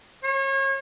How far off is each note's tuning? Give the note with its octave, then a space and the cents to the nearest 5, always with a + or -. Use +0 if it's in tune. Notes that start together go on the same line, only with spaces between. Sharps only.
C#5 -35